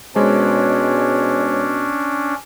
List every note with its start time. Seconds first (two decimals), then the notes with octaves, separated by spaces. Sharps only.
0.15 B2 G#3 C#4 D4 C5 C#5